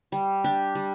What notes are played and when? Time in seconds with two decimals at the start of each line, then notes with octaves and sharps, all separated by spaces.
0.12 G3
0.44 D4 G4
0.75 G3